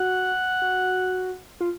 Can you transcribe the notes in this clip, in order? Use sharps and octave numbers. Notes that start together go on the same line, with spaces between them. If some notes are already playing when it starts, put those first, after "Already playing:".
Already playing: F#4 F#5
F#4
F4